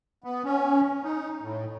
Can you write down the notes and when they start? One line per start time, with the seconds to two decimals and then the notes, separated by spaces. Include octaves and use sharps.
0.24 B3
0.45 C#4
1.04 D#4
1.42 A2